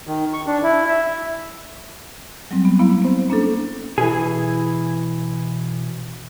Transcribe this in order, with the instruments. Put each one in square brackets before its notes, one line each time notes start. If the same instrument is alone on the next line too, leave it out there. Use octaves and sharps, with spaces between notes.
[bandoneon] D#3
C#6
D4
E4
E5
[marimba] F#3 G3 C4
B3
A#3 B3 E4 F5 B5
B3 C4 C5
A#3 C#4 D4 A4
[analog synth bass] B2 [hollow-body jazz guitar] E3 G#4